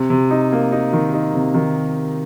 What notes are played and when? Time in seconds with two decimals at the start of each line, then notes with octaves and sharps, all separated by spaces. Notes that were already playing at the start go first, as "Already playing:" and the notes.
Already playing: C3
0.10 C3
0.30 D#4
0.52 A#3
0.72 D#4
0.93 D#3
1.14 D#4
1.34 C3
1.54 D#3